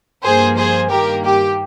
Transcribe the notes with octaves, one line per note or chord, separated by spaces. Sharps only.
G2 F3 A#3 G#4 C5
G#4 C5
G2 D#3 A#3 G4 A#4
G4